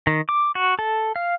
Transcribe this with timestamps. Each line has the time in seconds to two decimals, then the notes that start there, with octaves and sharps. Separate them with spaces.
0.07 D#3
0.29 D6
0.55 F#4
0.79 A4
1.16 F5